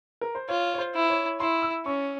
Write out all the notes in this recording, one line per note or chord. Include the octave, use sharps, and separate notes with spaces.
A#4
C5
F4 C#5
C#5
C5
E4
C#5
E4 C6
E6
C#4 C#6